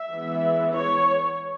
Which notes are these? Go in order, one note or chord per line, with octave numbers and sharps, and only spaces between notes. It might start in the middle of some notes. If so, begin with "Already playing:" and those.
Already playing: E5
E3 G#3 B3
C#5